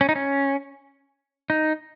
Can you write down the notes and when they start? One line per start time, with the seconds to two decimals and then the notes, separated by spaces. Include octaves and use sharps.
0.01 C#4
0.09 D#4
0.16 C#4
1.50 D#4